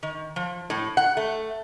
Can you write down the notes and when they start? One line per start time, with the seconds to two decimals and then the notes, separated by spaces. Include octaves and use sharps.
0.03 D#3
0.36 F3
0.70 A2
0.97 F#5
1.17 A3